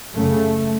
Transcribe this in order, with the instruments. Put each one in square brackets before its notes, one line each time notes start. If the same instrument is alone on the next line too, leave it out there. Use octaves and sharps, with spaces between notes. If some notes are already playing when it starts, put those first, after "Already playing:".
[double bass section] F#2 C#3 A3